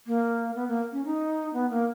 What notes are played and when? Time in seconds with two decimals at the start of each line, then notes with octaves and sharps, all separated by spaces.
0.07 A#3
0.56 B3
0.68 A#3
0.92 C#4
1.05 D#4
1.54 B3
1.70 A#3